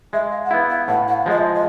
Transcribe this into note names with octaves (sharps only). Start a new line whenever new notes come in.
G#3 E5
F5
F#5
B3 E4 F5
F5
A2 F#5
F#5
F5
F3 G#3 D#5
E5
D#5